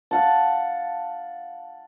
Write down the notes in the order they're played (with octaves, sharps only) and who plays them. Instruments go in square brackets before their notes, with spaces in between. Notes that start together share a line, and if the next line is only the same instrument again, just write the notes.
[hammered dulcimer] F5 F#5 A5